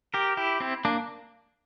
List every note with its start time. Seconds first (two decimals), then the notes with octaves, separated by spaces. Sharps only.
0.14 G4 A#4
0.37 E4 G4
0.60 C4 E4
0.85 A#3 D4